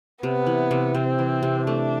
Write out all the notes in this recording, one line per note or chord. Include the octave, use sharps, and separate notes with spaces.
C3 B3
E3
C3
C3 C4
E3
C3
A3 D4